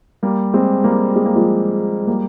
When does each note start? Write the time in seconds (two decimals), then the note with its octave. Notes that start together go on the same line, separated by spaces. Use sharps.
0.23 G3 A#3
0.54 G#3 C4
0.84 G3 A#3
1.16 G#3
1.26 A#3
1.36 F3 G#3
2.07 G3 A#3